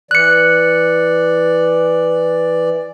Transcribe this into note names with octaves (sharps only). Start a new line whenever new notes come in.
E3 D5 F#6 C#7